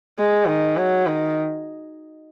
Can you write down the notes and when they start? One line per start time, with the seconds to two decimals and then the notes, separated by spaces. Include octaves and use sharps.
0.19 G#3
0.48 D#3
0.77 F#3
1.07 D#3